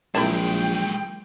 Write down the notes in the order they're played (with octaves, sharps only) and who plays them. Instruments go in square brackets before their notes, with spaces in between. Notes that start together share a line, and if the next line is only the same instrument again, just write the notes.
[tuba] A#1 [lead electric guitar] F#3 G#3 [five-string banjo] E4 A#4 A5 [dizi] G5